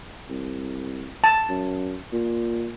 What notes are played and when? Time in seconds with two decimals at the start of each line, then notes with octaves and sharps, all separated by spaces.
0.29 C2
1.24 A5
1.49 F#2
2.12 A#2